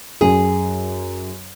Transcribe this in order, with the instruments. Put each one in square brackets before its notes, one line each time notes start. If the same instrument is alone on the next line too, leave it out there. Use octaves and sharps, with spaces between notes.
[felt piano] F#2 [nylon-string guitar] G#4